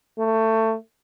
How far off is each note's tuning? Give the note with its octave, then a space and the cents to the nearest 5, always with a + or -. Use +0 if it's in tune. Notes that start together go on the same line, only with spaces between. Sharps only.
A3 +20